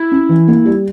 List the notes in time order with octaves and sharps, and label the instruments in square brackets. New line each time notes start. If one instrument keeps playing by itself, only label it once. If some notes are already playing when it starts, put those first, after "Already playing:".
Already playing: [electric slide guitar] E4
[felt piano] C#4
E3
A#3
G3